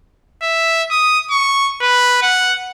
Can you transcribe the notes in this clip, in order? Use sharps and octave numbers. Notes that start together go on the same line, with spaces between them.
E5
D#6
C#6
B4
F#5